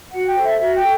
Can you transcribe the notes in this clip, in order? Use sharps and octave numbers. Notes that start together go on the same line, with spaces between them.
F#4 F#5
G5
A4 C5
E5
F#4 E5
G5
A4